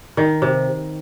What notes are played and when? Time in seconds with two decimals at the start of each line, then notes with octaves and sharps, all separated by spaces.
0.17 D#3
0.42 C3